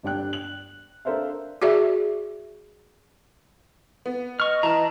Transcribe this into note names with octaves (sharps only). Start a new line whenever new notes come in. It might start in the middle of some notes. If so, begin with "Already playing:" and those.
G1 G3 D4 G5 F#6
F#7
D4 A4 A#4 C5 E5 F5
F#4 G#4 D5 E5
B3
D#5 C#6 F6
E3 A5 A#5